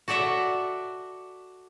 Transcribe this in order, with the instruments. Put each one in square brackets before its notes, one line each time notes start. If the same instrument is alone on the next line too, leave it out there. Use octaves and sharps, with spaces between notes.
[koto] F#4 A4 D5 E5 F#5